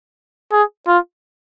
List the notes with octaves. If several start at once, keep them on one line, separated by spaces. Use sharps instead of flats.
G#4
F4